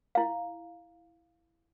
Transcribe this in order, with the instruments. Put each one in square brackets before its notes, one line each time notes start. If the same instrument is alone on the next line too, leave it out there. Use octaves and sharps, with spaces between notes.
[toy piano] E4 F5